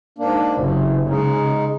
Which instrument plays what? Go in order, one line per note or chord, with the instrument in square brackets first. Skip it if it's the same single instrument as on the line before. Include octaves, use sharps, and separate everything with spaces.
[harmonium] G#2 A#3 D4
[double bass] F#1 [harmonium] C3
[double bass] C#3 [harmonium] G#3 D#4